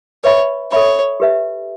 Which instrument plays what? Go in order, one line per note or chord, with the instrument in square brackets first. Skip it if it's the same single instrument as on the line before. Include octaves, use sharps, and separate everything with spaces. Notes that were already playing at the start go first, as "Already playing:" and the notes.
[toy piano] B4 E5 B5 [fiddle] C#5
[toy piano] A4 E5 B5 [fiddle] C#5
[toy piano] G4 B4 E5